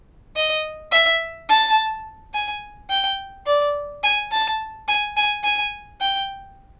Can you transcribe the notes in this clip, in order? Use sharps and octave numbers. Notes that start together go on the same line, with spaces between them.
D#5
E5
A5
G#5
G5
D5
G#5
A5
G#5
G#5
G#5
G5